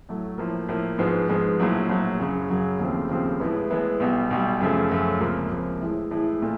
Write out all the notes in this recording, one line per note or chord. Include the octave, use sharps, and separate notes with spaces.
A2 F#3 A3
A2 F3 A#3
A2 F3 A#3
G#2 F3 G#3 B3
G#2 F3 G#3 B3
A#1 A2 F#3
A#1 A2 F#3
F#2 C#3 F#3
F#2 C#3 F#3
D#2 C#3 F3 A3 C4
D#2 C#3 F3 A3 C4
A2 E3 G#3 B3 E4
A2 E3 G#3 B3 E4
B1 B2 G3
B1 B2 G3
F#2 C#3 F3 A3
F#2 C#3 F3 A3
C#2 C3 F3 A#3
C#2 C3 F3 A#3
A2 E3 G#3
A2 E3 G#3
A#2 A3